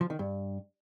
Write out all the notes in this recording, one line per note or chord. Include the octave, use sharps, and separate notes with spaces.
F3
D#3
G2